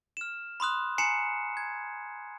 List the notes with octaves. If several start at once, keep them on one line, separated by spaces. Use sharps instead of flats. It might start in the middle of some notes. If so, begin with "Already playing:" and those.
F6 E7
B5 C6 D#6 F#6
G#5 A#5 C6 C7 C#7 E7
G#6